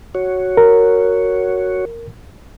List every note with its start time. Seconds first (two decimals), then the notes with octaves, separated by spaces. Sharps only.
0.15 F#4 C#5
0.57 A#4